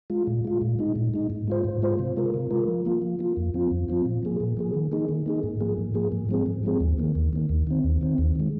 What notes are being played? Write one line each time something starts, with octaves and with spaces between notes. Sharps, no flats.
G#3 F4
A#2
G#3 F4
A#2
G#3 D#4
A#2
G#3 D#4
G#2
G#3 F4 C5
G#2
G#3 F4 C5
C3
G#3 F4 A#4
C3
G#3 F4 A#4
F3
A#3 F4
F3
A#3 F4
F2
F3 C4 F4
F2
F3 C4 F4
A#2
F3 A#3 G#4
A#2
F3 A#3 G#4
D#3
A#3 D#4 G#4
D#3
A#3 D#4 G#4
G#2
F3 A#3 G#4
G#2
F3 A#3 G#4
G#2
F3 G#3 C4 G#4
G#2
F3 G#3 C4 G#4
D#2
D#3 A#3
D#2
D#3 A#3
D#2
D#3 C4
D#2
D#3 C4
D#2
D#3 G#3